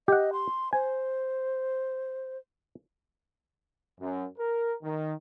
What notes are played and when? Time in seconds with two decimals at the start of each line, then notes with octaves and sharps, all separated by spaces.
0.08 G4 D#5 F#5
0.33 C6
0.73 C5 G#5
3.99 F#2
4.38 A#4
4.82 D#3